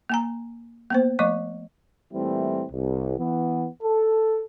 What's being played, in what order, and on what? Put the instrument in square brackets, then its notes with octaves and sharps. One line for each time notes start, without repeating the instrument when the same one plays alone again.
[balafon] A#3 G#5 A#5
A#3 B3 C5
F3 A3 D#5 C#6
[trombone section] A#2 E3 G3 A3 C4 E4
C2
E3 B3
A4